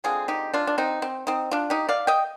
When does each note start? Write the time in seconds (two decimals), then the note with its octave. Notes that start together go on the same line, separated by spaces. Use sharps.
0.04 D3 F3 G#3 C4 F4 G#4
0.28 D#4 G4
0.54 D4 F4
0.67 D4
0.78 C4 D#4
1.02 C4
1.27 C4 D#4
1.51 D4 F4
1.70 D#4 G4
1.89 D5 F5
2.07 D#5 G5